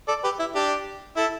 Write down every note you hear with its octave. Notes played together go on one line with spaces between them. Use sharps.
A4 D5
G4 B4
E4
D4 G4
E4 A4